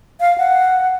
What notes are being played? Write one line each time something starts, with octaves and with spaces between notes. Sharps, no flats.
F5
F#5